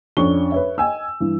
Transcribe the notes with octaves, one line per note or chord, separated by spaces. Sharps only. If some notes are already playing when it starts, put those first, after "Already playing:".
F2 C#4 D4 C#6 G7
B4 C#5 E5
D#5 G5 G#5 E6
G2 E3